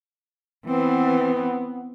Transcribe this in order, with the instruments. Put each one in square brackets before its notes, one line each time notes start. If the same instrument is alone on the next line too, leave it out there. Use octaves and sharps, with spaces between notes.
[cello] E3 C4 [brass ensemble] B3